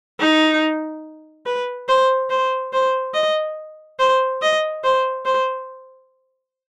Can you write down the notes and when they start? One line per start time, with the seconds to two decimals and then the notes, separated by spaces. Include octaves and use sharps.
0.20 D#4
1.46 B4
1.89 C5
2.30 C5
2.73 C5
3.14 D#5
3.99 C5
4.42 D#5
4.84 C5
5.25 C5